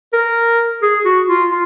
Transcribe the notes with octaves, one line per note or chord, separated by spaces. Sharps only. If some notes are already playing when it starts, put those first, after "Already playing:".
A#4
G#4
F#4
F4
F4